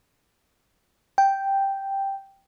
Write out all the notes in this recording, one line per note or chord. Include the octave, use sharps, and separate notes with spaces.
G5